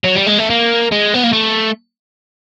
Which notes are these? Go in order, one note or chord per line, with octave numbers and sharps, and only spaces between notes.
F#3
G3
G#3
A3
A#3
G#3
B3
A#3
A3